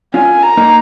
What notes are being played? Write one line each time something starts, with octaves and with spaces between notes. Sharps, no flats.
C#4 F4 G#5
A#5
A#3 D#4